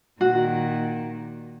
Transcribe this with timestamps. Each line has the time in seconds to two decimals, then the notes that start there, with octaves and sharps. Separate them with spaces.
0.21 A#2 D#3 F#4